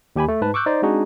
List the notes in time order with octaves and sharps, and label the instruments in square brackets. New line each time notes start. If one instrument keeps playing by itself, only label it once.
[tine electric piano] D#2 G4 G#5 B5
A3
G#2 B4 A5
C#6 D6 E6 F#6 G6
D#4 C5 D5
G#3 C4 D4 D#4 F#4 G#4